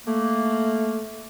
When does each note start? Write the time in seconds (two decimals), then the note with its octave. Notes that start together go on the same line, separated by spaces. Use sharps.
0.06 A3 A#3